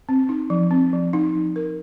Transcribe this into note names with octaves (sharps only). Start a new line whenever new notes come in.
C4
D#4
F3
C4
F3
D#4
F3
A#4